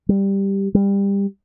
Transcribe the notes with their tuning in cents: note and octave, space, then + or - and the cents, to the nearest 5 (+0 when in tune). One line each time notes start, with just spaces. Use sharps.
G3 +5
G3 +25